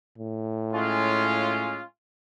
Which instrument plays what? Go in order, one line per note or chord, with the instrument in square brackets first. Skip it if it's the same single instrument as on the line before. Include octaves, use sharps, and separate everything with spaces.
[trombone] A2
[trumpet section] G#3 C#4 F4